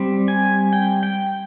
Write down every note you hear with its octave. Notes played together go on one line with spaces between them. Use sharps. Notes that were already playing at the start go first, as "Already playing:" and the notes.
Already playing: G3 C4
G#5
G5
G5